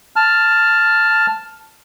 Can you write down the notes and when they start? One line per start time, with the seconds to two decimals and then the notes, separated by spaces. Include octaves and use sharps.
0.16 A5 F6